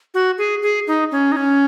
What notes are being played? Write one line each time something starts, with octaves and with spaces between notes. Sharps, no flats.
F#4
G#4
G#4
D#4
C#4
D#4
C#4